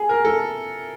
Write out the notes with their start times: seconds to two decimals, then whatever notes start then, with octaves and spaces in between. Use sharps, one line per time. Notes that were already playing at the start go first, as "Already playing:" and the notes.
Already playing: G#4
0.09 A#4
0.25 A4